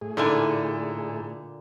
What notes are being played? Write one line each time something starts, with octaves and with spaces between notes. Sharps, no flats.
A2 G#4
A#2 D3 D#4 E4 A4 G#5